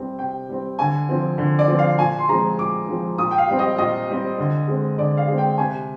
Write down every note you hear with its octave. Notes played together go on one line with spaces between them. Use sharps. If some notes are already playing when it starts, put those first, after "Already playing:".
Already playing: C3 G3 C4
C3 G5
G3 C4
D3 G#5
F3 C4
D3
D5
F3 C4
F5
A#2 G#5
C6
F3 G#3 C4 A#5
A#2 D6
F3 G#3 C4
A#2 D#6
G5
F5
G3 C4
D#5
A#2 D#5
G3 C4
D3
G#3 C4
D3 D5
F5
G#3 C4
G5
C3 G#5